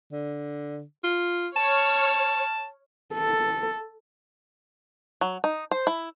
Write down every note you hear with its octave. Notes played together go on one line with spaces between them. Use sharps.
D3
F4
C#5 A5 F6
A4
F#3
D#4
C5
E4